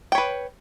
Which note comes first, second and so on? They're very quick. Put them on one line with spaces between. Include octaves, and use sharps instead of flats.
G5 C#5 B4